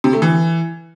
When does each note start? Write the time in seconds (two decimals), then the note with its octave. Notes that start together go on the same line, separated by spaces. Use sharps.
0.04 C3
0.13 A3
0.22 E3